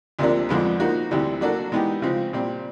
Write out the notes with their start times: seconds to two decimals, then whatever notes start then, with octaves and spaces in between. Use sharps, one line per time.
0.19 D2 C3 F3 A#3 D4
0.49 F2 D3 F3 G#3 B3
0.80 F3 A#3 D#4 F#4
1.11 D2 C3 E3 G3
1.41 F#3 A#3 D4 F#4 A4
1.72 E3 G#3 B3 D#4 G4
2.02 C#3 F3 G#3 C4
2.33 A#2 G3 C4